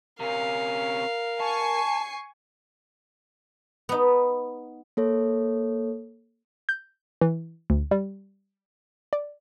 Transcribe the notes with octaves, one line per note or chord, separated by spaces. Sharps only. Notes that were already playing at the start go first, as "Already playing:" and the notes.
C3 C#4 A#4 F5
G#5 A5 C#6 C7
B3 D#4
A#3 A4 C#5
G6
E3
D2
G3
D5